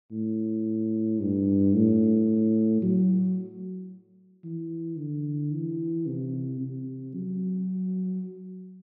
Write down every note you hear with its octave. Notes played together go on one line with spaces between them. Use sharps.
A2
G2
A2
F#3
E3
D3
E3
C3
C3
F#3